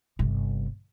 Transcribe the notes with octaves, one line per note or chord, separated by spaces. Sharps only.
G1 C3